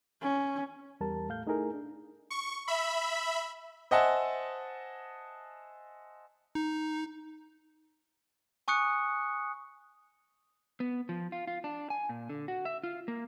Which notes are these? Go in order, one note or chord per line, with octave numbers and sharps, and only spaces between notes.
C#4
E2 G3 A#4 A5
A2 A3 F5 G6
A3 D#4 E4 G#4 A#4
D4
C#6
E5 B5
C5 D#5 E5 F#5 G#5 A5
D#4
G#5 C#6 D#6 F#6 C#7
B3
F3
F4
F4
D4
G#5
A#2
D3
F#4
E5
F4
A#3